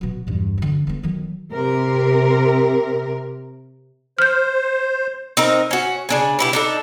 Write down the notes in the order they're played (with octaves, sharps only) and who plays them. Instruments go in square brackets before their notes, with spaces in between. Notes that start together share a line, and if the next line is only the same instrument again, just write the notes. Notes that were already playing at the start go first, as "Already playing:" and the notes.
[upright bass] B2 F#3
E2 G2
D3 F#3
A3 B3
D#3 F#3
[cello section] C3 A#4
[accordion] C5 [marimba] F6 G6
[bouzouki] C4 D#4 A#4
C#4 F#4
C#3 D4 G#5
B2 E4 G4
D4 D#4 A4